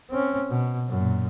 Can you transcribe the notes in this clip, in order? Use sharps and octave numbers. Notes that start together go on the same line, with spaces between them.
C4 C#4
B2
F#2 A#2